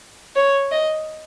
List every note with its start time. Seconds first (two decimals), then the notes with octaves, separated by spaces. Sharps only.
0.36 C#5
0.71 D#5